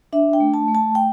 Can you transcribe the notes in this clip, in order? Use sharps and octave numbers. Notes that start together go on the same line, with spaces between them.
D4 E5
G5
A3
A5
A3
A5
A3 G5